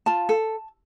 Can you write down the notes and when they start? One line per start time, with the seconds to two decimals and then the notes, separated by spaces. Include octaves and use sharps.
0.06 F4 A5
0.29 A4